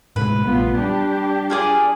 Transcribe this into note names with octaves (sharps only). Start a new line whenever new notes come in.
A2 C3 G#3 B4
A#1 G3 A3 B3 F4
G3 D4 G4
F4 G#4 D5